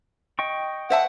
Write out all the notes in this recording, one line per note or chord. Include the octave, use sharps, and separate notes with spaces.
D#5 G5 C#6
C5 E5 F#5 A5